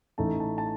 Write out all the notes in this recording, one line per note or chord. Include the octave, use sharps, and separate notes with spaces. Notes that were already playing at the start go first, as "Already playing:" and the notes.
A1 A2 A3 D#4 A5
A5
A5